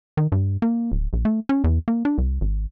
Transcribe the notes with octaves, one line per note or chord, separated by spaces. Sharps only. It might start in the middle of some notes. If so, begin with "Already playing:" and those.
D#3
G2
A#3
D1
A#1
A3
C#4
E2
A#3
D4
C2
G#1